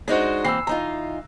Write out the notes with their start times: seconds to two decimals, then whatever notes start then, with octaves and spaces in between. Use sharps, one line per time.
0.08 G#3 D4 D#4 F#4 C5
0.45 E3 A#3 C4 E6 C7
0.67 E3 D#4 F4 A#5